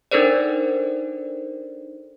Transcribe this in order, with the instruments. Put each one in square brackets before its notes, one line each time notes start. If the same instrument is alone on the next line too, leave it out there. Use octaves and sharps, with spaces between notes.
[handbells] D4 D#4 A4 A#4 C5 D5